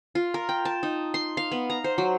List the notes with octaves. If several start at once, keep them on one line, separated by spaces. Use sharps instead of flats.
F4
A#4
G5
A5
D#4
C6
F5
B3
A#5
C5
F#3